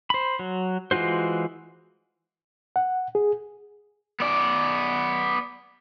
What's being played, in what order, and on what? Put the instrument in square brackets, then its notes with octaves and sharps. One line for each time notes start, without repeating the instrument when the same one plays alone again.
[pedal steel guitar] C5 B5
F#3
E3 G#3 F4 F#4 C5
[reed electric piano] F#5
G#4
[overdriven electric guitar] B3 D5